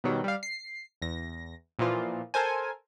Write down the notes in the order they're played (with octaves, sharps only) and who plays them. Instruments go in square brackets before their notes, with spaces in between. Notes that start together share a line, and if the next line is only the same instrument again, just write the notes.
[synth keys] B2 D#3 F#3 G3
G3 F5
C7
E2 A#6
A#2 E3 F3 F4
A4 A#4 C5 G#5